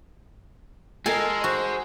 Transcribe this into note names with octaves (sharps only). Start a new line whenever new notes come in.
G#3 A4 A#4 D#5 G#5
F#4 C5